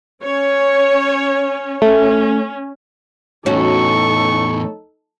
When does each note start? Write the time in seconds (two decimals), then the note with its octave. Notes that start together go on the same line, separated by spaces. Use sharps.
0.22 C#4 C#5
1.82 A3 C#4
3.46 E2 A2 C#4 D#4 F#4 A4 C#6